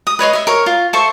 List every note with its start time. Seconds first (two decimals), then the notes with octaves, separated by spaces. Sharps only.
0.07 D#6
0.19 B4 C#5 D#5 C6
0.33 D#5 E5
0.47 A#4 C#5
0.66 F4
0.93 A4 C5 E5 C#6